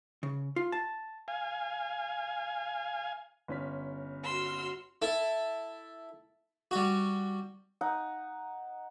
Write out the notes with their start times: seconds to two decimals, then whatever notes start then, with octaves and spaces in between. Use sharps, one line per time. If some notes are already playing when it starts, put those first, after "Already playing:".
0.23 C#3
0.56 F4
0.72 A5
1.28 F5 G#5
3.48 G1 C#4 B6
4.22 F#4 C6 E6 F6
5.02 E4 A4
6.71 G3 F#4
7.81 D#4 F#5